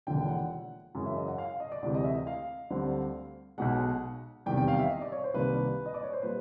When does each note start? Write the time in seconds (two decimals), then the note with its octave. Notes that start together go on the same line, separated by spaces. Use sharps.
0.07 E1 D#2 D3 F3 G5
0.28 F#5
0.95 F#2 C#3 E3 G#3 C#4
1.06 E5
1.17 D#5
1.28 F#5
1.38 F5
1.60 D#5
1.72 D5
1.82 D2 C3 E3 G#3 D5
1.94 D#5
2.04 E5
2.15 D#5
2.27 F5
2.70 D2 D3 G3 C4
3.58 B1 B2 G#3 F#5
4.46 F1 E2 C3 D#3 G3 G5
4.57 G5
4.68 F5
4.79 E5
4.90 D#5
5.02 D5
5.12 C#5
5.24 C5
5.34 C2 C3 D#3 G3 A#3 B4
5.86 D#5
5.94 D5
6.03 C#5
6.13 C5
6.22 A#2 G3 A#3 B4